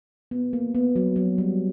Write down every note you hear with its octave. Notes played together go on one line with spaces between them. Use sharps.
B3
A#3
B3
F#3
F#3
G3